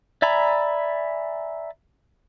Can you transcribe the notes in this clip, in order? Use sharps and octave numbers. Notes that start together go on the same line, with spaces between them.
D5 E5 G#5 A#5 B5